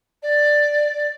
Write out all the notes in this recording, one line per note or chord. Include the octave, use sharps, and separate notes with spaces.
D5